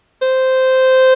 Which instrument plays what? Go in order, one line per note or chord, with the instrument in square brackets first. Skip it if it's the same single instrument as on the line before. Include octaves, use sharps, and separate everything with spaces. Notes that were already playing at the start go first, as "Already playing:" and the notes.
[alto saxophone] C5